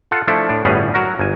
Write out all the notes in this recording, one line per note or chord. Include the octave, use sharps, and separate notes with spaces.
F4 A4 F#5
F3 A3 D4 E4 A4
A2 D4
G1 A2 G3 B3 C#4 G#4
F#3 F#4 A#4
G1 G#5